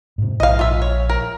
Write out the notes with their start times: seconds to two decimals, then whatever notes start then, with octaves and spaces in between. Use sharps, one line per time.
0.18 G#2 C3
0.40 A#1 D#5 F5
0.59 F4 E5
0.82 C#5
1.09 A#4